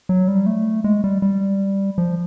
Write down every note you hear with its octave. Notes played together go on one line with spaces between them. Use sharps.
F#3
G3
A3
G#3
G3
G3
F3